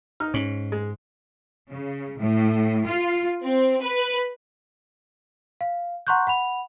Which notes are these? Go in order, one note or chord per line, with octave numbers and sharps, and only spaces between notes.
D#4 F6
G#2 C#4
G#3
C#3
A2
F4
C4
B4
F5
F#5 A#5 C6 C#6 F#6 G6
F#5 B5 F7